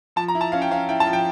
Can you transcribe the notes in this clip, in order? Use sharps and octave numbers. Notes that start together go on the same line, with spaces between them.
F3 A5
A#5
E4
A5
C#4 F5
G5
C#4 F5
E4 G5
A5
F3
G5